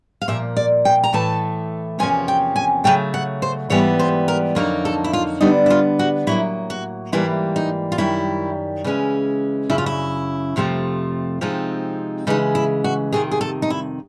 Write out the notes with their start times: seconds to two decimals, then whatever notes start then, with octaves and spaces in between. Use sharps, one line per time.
0.22 F5
0.28 A#2 F3 A#3 E5
0.57 D5
0.85 G5
1.04 A#5
1.13 A2 E3 A3 A5
1.99 E2 C3 F3 A#3 C#4 G#5
2.28 G5
2.56 G#5
2.84 D2 C#3 F#3 A3 G5
3.14 F#5
3.42 C5
3.70 G#2 E3 G3 B3 C#5
3.99 C5
4.28 A#4
4.55 F2 D3 F#3 A#3 D#4
4.85 A4
5.04 E4
5.13 F4
5.41 D3 G3 B3 D4 D#4
5.66 E4
5.70 F4
5.99 F#4
6.27 A2 F#3 A#3 E4
6.70 F#4
7.12 G#2 E3 G3 A#3 E4
7.56 D#4
7.92 F4
7.98 F#2 D#3 G3 E4
8.84 C#3 E3 G#3 C#4
9.70 F#2 C#3 F#3 E4
9.78 F4
9.86 E4
10.56 F2 C3 F3 A3
11.41 C3 F3 G#3 C4 D#4
12.27 C#3 E3 G#3 D#4
12.55 E4
12.84 F#4
13.13 F2 C3 D#3 G#4
13.31 G#4
13.41 A4
13.62 D#4
13.70 E4